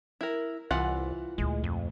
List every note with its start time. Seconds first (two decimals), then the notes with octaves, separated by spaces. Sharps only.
0.21 E4 A#4
0.71 C2 E3 F4 F#5
1.38 D2 A#2 G#3
1.64 F2